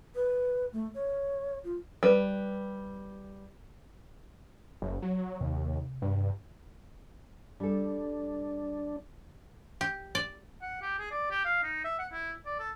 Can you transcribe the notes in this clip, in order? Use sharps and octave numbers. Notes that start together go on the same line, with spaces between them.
B4
A3
C#5
F4
G3 B4
F#1
F#3
D#2 C3
G2
G3 D4 A4
G4
D5
F#5
G4
G#4
D5
G4
F5
D#4
E5
F#5
E4
D5
A4